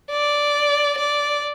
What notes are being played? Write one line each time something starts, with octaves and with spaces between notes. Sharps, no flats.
D5
D5